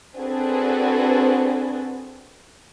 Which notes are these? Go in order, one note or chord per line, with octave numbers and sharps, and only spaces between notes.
C4 D4 F#4 G#4 A4 B4